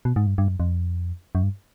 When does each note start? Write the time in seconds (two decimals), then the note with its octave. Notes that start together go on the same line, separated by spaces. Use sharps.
0.05 B2
0.16 G#2
0.27 G2
0.38 G2
0.48 F#2
0.60 F2
1.35 F#2
1.43 G2